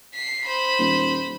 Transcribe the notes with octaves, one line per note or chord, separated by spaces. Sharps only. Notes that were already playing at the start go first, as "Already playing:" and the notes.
B6 C7
C5 B5
D#1